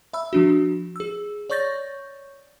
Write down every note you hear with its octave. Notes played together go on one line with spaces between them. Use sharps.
E5 B5 E6
F3 D4 F#4
G#4 E6
C#5 D5 C#6 G6 A6 A#6